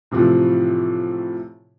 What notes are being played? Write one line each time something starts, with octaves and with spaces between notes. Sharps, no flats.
A2 C3 E3 F3